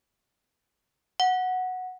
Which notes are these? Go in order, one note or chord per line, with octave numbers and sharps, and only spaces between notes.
F#5